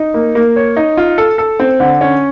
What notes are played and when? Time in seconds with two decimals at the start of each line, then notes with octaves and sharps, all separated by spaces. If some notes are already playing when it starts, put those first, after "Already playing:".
Already playing: D#4
0.14 A#3
0.35 A#3
0.56 C#5
0.76 D#4
0.97 F4
1.18 A4
1.38 A4
1.59 C4
1.80 D3
2.01 C#4